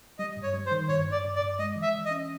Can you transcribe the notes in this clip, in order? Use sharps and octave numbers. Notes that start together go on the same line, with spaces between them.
G3 D#5
G2
C#5
G3
C5
D#3
G2 C#5
G2
D5
G2
D5
G2
G#3 D#5
E3
E5
E3
D#5
C#4